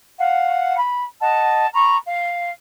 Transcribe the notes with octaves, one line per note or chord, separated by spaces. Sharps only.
F5 F#5
B5
D#5 F#5 A5
A#5 B5 C#6
F5